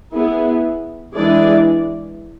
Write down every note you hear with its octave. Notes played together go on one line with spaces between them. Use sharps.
B3 E4 G#4
E3 G#3 D4 G#4 D5